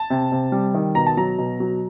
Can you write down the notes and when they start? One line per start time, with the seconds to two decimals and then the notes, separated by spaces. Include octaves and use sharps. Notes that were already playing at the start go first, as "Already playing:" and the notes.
Already playing: A5
0.10 C3
0.32 C3
0.52 G3
0.74 D#3
0.95 B2 A#5
1.06 A5
1.17 F#3 A#5
1.38 B2
1.60 F#3